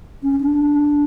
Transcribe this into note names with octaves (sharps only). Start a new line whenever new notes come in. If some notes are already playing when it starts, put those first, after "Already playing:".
C#4
D4